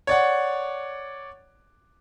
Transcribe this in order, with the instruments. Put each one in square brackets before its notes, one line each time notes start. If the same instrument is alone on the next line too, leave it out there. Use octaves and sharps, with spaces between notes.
[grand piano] C#5 D5 F#5